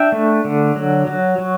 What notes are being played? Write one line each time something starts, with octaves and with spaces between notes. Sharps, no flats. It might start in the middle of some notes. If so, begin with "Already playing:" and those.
Already playing: D4 E5 G5
A3
D3
F#3
F#3
F#3